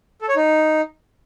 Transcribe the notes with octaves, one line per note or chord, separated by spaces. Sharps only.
A4
C#5
D#4